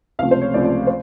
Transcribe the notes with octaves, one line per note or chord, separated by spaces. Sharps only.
C#2 C3 F3 A3 F5
C5
C#5
C#2 C3 F3 A3 D5
D5
C5